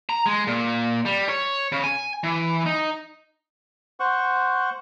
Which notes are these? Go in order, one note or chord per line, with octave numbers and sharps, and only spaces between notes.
A#5
G#3
A#2
G3
C#5
C#3
G#5
E3
D#4
C5 F#5 C#6